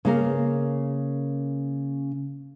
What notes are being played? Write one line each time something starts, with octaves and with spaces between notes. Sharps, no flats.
C#3 A#3 A#4